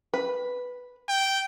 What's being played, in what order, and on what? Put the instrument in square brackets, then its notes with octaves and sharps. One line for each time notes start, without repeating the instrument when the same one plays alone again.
[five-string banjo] B4
[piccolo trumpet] G5